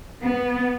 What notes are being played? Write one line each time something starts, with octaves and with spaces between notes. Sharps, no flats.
B3